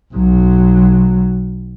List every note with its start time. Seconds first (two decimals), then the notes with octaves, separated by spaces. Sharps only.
0.14 B1 F#3